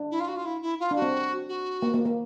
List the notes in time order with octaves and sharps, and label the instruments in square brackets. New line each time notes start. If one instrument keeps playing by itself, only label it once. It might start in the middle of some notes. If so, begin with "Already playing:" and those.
Already playing: [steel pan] D4
[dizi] E4
F4
F#4
F4
E4
E4
F4
[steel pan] D4
[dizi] F#4
[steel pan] C4
[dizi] F#4
[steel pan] A#3
A#3
A#3